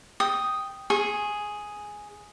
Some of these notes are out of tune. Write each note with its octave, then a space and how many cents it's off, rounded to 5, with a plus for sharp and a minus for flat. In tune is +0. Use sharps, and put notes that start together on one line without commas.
G5 +0 D#6 +0
G#4 +0 C#6 -30